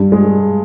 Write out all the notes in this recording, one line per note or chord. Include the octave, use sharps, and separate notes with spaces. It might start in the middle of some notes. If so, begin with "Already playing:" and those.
Already playing: G2
G#3